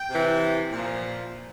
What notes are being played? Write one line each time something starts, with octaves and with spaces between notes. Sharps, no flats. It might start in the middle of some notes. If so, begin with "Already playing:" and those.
Already playing: G5
C3 E3
A#2 F3